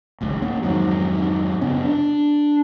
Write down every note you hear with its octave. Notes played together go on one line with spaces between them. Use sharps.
D1 G#1 C#2
A#3 C#4
F2 G#2 D#3 F#3
F#2 C#3 B3 C#4
D4